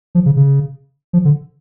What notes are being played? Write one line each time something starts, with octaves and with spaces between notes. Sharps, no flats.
F3
C#3
C#3
F3
D3